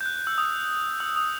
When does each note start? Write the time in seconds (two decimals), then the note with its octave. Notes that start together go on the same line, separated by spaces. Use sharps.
0.01 G6
0.06 F#6
0.16 F#6
0.27 E6
0.38 D#6
1.00 E6
1.16 D#6